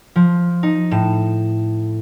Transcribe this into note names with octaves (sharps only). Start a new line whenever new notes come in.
F3
D#4
A2 E7